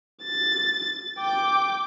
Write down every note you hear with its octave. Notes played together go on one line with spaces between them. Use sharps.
A6
G5 D6